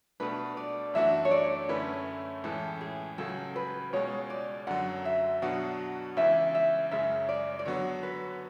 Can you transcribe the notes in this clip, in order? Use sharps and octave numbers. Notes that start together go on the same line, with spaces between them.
B2 A3 D4 B4
D5
F#2 E3 A3 D4 F#4 E5
C#5
D5
F#2 D3 A3 C#4 E4 B4
A2 E3 G#3 C#4 A4
G#4
C#2 C#3 F#3 A4
B4
C#2 B2 G#3 C#5
D5
F#2 D3 F#3 F#5
E5
B2 F#3 B3 D4 F#4 F#5
C#2 C#3 E3 E5
E5
F#2 C#3 G#3 C#4 E5
D5
D5
D3 F#3 B3 F#4 C#5
B4